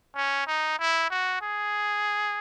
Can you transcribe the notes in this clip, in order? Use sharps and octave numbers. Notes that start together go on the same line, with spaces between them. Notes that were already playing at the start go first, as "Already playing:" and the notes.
C#4
D#4
E4
F#4
G#4